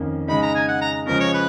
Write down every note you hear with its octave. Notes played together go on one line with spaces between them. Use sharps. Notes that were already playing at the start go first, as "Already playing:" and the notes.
Already playing: F2 D#3 A#3 C#4
C#3 G#3 D#4 B5
A#5
G#5
F#5
A#5
C#3 F3 G#3 C#4 A#4
C#5
B4